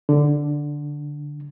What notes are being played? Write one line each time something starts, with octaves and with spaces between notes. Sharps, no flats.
D3